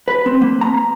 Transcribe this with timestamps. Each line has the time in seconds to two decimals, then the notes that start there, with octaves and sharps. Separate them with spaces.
0.08 B4
0.26 C4
0.42 A#3
0.61 A#5